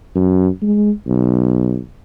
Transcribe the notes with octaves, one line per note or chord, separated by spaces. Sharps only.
F#2
G#3
B1